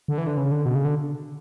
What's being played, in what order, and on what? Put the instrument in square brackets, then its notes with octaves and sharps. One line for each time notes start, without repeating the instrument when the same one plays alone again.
[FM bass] D3
E3
D3
C#3
D3
B2
C#3
D3